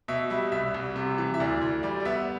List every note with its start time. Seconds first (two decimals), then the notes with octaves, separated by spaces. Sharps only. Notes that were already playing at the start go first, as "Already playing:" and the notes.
0.08 B2 E5
0.30 G3 E5
0.52 C2 E5
0.74 C2
0.96 C3
1.18 E3
1.34 E5
1.40 D2 D5
1.61 D2
1.83 G3 D5
2.00 D5
2.05 B3 E5